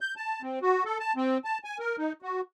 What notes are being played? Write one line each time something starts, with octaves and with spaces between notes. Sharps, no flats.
G6
A5
C4
F#4
A4
A5
C4
A5
G#5
A#4
D#4
F#4